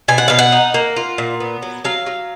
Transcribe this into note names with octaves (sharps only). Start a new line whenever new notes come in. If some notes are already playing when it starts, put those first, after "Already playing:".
B2 G#5
F#5
B2 F5
F#5
D#4
A#3
F4
A#2
B3
F#3
F#3 F5
F#3